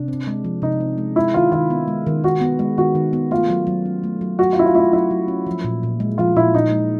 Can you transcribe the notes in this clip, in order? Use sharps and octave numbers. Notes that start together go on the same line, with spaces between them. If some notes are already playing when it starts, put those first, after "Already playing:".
Already playing: C3 D4
C4
G#3
F3
C3 D#4
C4
G#3
G#3 E4
D#3 F4
D#3 F4
B3
G#3
D#3
D#3 F#4
B3
G#3
D#3 F#4
D#3
B3
A3 F4
F#3
F#3
C#4
A3
F#3
F#3 F#4
F4
C#4 E4
F4
A3 E4
F4
F#3 E4
F#3
C#4
F3
A#2
A#2
G#3
F3 F4
A#2 E4
A#2 D#4
G#3